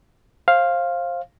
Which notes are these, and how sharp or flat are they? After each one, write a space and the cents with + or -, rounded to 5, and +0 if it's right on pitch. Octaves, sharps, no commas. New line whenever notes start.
C5 +25 F5 +0